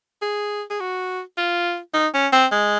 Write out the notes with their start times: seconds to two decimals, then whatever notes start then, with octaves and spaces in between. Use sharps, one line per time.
0.22 G#4
0.70 G#4
0.80 F#4
1.37 F4
1.94 D#4
2.14 C#4
2.32 C4
2.52 G#3